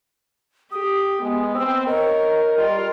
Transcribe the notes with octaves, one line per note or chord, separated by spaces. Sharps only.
G4 D#6
G#3 B3
C4 E6
A#4 C#5 D#5
G3 F4 A#4 D#5